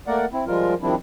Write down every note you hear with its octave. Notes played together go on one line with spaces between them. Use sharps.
A3 A#3 A#4 D5 F#5
C4 E4
F3 G3 G#3 F4 A#4
D#3 F3 G3 C4 D4 E4